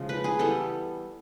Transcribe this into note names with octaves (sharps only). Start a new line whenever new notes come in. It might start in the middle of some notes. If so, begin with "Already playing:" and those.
Already playing: C#3 F3 G#3
B4
G#4
E3 G3 B3 A4